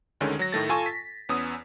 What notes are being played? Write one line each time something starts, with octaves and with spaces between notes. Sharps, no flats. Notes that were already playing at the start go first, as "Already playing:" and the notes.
D2 D3 D#3 G#3 C#4
F#3 A#6
A2 D#3 A3 A6
F4 A4 G#5 A5 C#6
B6
E2 B3 C#4 D#6 E6